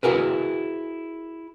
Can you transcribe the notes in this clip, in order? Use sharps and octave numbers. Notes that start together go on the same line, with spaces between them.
E4 F#4 G#4 A#4 B4